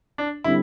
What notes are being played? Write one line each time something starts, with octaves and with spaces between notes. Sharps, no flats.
D4
D3 G3 C4 E4